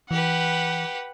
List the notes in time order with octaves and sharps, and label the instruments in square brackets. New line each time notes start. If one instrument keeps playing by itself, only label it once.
[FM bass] E3 [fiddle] G4 B4 [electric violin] F#5